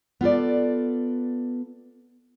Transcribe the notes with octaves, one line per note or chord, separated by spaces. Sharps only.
B3 F4 A4 D5